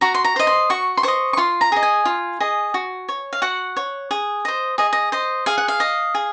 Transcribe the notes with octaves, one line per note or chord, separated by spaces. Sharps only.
F#4 A#5
C6
A#5
C5 D#5
C6
F#4 C#6
C6
C5 D#5 C#6
C#6
F4 C6
A#5
G#4 D#5
G#5
F4
G#4 D#5
F#4
C#5
F5
F#4 F#5
C#5
G#4
C5 D#5
G#4 D#5
D#5
C5 D#5
G#4 F5
F#5
F5
D#5
G#4